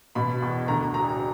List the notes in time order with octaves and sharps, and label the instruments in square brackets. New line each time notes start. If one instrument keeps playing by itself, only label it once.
[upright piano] B2 B5
E2
D2 A#5
E1 A#5